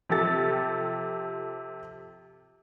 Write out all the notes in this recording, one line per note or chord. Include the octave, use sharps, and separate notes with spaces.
C3 F3 G4 A4 A6